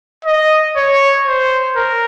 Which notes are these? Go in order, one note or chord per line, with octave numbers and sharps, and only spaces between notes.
D#5
C#5
C5
A#4